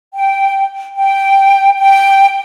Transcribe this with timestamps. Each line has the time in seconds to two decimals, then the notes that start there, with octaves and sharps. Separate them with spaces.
0.14 G5
0.96 G5
1.77 G5